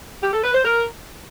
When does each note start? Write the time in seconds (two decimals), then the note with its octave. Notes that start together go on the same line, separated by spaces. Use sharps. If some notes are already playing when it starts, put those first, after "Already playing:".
0.22 G4
0.33 A4
0.43 B4
0.54 C5
0.65 A#4